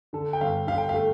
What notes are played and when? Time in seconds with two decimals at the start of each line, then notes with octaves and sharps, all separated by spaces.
0.13 D3 A4
0.33 G5
0.41 G1 F5
0.67 D3 F5
0.78 G5
0.89 A3 F5